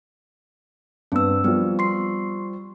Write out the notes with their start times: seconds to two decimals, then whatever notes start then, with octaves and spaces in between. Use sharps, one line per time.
1.12 G2 B3 C4 E6
1.44 F3 G3 B3
1.79 C6 C#6 C7